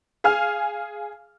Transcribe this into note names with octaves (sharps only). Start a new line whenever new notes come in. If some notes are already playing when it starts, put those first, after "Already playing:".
G#4 F5 G#5 F6